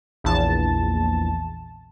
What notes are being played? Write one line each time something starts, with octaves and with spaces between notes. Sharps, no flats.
A#1 E2 A5